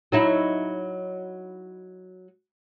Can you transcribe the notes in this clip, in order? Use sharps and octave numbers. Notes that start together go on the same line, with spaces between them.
F#3 D#4 E4